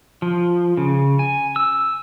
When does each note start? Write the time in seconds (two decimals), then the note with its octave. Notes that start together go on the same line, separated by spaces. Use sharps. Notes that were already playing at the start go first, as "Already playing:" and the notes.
0.22 F3
0.77 C#3
1.19 G#5
1.56 E6